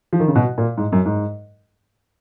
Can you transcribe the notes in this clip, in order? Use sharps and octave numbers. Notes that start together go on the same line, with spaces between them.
F3
D#3
C#3
B2
A#2
G#2
F#2
G#2